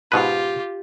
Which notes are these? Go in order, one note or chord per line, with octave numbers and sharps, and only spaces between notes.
G#2 B2 F4 G4 B4